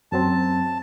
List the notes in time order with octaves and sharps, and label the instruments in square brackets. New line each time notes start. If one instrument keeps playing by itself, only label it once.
[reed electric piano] F#2 F#3 C4 [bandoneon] A5